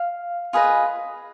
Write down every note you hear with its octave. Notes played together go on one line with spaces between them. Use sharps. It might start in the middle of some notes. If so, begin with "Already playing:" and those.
Already playing: F5
F4 G#4 B4 D#5